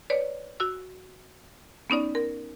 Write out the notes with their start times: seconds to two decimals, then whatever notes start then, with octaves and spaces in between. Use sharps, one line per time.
0.10 B4 C#5 D5
0.60 F#4 E6
1.90 B3 C#4 D#4 D5
2.15 A#4